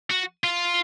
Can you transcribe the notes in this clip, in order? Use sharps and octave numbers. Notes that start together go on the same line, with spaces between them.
F#4
F4